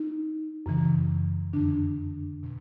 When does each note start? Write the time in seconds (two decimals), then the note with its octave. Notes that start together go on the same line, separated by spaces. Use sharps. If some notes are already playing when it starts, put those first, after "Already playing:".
Already playing: D#4
0.66 F#2 C#3 E3
1.53 F2 D3 D4
2.43 B2